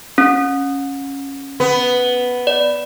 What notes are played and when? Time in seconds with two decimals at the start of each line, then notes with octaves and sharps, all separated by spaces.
0.18 C#4
1.60 B3
2.47 D5